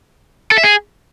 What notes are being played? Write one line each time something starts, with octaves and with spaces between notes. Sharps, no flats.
A4
E5
G#4